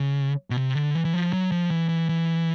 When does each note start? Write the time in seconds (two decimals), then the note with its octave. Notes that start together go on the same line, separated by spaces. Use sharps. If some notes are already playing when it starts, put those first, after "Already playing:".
Already playing: C#3
0.50 B2
0.57 C3
0.75 D3
0.95 E3
1.05 E3
1.14 F3
1.33 F#3
1.52 F3
1.71 E3
1.89 E3
2.09 E3